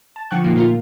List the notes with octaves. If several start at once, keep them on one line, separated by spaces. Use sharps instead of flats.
A5
D3 F3 F#5 G5 C#6 F#6
A#2 D#3 F3 A#3
A#2 A3 F4 A#4